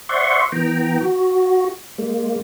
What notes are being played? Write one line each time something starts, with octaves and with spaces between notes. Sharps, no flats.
C5 D5 E5 F#5 C6 C#6
E3 B3 G5 A#5
F#4
G#3 A#3